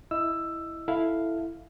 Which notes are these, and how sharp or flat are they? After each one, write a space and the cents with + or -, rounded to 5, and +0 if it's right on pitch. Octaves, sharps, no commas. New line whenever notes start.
E4 -5 D#5 +0 E6 +10
E4 +0 A4 +0 F5 +0